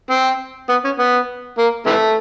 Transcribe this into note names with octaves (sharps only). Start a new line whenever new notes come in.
C4
B3
C#4
B3
A#3
C3 E3 A3